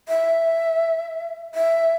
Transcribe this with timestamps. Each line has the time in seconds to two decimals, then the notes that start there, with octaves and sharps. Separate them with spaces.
0.08 E5
1.55 E5